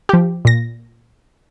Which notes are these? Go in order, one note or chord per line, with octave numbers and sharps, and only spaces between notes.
F3 G4
A#2 A#6